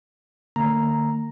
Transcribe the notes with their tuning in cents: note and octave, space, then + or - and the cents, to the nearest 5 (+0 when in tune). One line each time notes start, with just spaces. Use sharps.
D3 +35 A#3 -40 A#5 +0